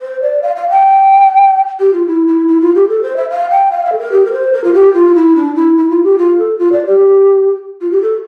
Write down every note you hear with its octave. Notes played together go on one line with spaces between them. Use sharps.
C5
D5
F5
F5
G5
G4
F4
E4
E4
E4
F4
G4
A4
C5
E5
F5
G5
F5
E5
A4
A#4
G4
A#4
C5
A#4
F4
G4
F4
E4
D4
E4
E4
F4
G4
F4
A4
F4
D5
G4
F4
G4
A4